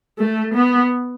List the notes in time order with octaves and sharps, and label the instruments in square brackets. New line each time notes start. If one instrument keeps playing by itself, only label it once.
[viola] A3
B3